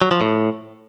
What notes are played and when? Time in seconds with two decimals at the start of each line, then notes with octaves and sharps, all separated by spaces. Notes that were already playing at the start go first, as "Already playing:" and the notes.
0.02 F#3
0.11 F3
0.21 A2